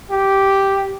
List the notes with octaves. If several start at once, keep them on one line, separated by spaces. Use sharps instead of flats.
G4